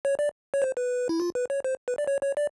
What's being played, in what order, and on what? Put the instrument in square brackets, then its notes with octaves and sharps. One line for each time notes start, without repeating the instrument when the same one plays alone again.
[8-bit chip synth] C#5
D5
C#5
C5
B4
E4
F4
B4
C#5
C5
B4
D5
C#5
C#5
D5